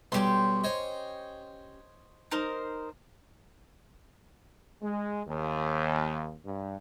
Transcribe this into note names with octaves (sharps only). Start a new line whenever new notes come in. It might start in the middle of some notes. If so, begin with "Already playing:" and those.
B1 G3 C#4 G4 C6 C#6
C5 C#5 D#5
D#4 A#4 C5
G#3
D#2
G2